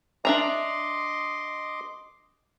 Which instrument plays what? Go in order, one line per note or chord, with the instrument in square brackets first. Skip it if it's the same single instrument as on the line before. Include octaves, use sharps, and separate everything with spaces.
[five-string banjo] D4 E5 A#5 [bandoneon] D#5 C6 D6